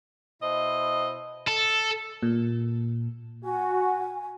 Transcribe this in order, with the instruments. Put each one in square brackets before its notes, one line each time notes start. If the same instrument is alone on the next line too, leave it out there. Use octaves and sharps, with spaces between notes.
[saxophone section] B2 E4 C5 D#5
[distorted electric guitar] A4
[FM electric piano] A#2
[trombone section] F#4 [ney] G#5